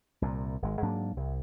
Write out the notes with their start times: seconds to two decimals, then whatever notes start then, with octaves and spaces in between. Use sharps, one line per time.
0.22 C2 A#2
0.62 G#1 G#3
0.82 G#2 F#3 A#3 D4
1.17 C2